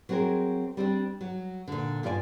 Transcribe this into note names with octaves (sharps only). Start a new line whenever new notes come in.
F#3 C4 F#4 G#4 A#4
G3 C4 D4
F#3
A#2 D3
G2 F3 F4 D5 G#5